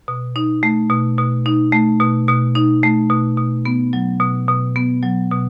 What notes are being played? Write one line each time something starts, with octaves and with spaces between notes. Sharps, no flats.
B2
D#4
A3
B2
B2
D#4
A3
B2
B2
D#4
A3
B2
B2
B3
F#3
B2
B2
B3
F#3
B2